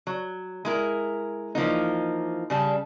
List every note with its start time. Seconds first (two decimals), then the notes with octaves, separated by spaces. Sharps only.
0.07 F#3
0.65 G#3 E4 A#4
1.55 E3 F3 A#3 D#4
2.50 C#3 G3 A5